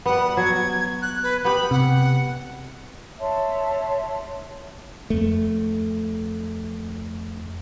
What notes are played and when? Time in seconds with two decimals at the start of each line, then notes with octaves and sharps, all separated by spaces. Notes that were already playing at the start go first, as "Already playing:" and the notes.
0.06 G3 B3 F#5
0.37 F#3 G#6
1.02 F#6
1.23 B4
1.45 B3 G4 B5
1.71 C3 F#5
3.20 C#5 E5 A5 C6
5.10 F2 A3